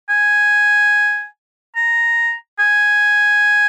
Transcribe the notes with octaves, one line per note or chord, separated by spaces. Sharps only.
G#5
A#5
G#5